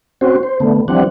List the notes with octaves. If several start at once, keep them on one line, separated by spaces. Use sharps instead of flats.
C4 C#4 F#4 C5
C5
D3 A3 B3
E3 F3 G3 C4 D4 F#5